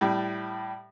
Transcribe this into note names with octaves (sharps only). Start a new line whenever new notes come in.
A2 G3